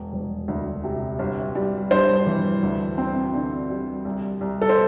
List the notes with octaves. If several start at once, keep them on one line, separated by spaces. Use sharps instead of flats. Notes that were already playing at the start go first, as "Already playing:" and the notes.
Already playing: E1
E1
D2
C3
G1
G3
G2 C5
E3
D2
C4
D3
G3
C2
C2
A4
C5